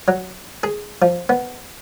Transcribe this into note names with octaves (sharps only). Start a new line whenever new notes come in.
F#3
G#4
F3
B3